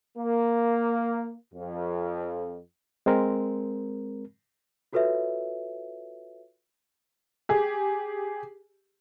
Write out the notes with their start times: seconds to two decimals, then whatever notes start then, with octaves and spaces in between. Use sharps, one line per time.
0.18 A#3
1.54 F2
3.06 G#3 C4 A#4
4.93 F4 F#4 A4 B4 C#5 E5
7.49 G4 G#4